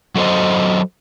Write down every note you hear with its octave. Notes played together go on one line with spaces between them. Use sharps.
F#3 A4 C5 D#5